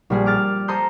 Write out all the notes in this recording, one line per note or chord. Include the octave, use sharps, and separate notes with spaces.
A#1 G3 G#4
D6 F6 A6
A4 C5 A#5 C6 D#6 G6